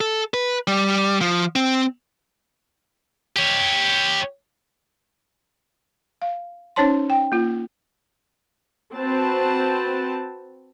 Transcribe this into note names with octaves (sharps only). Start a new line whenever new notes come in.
A4
B4
G3
F3
C4
G4 C#5
F5
C#4 D#4 C5 C#5 A5 C6
G5
A#3 F4
C4 F#4 B4 C5 A5